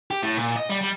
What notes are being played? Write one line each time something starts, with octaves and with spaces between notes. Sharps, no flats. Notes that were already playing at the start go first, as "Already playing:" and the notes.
G4
A2
A#2
D#5
G3
G3